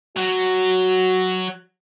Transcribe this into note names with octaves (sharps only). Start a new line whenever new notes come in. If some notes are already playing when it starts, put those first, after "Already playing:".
F#3 F#4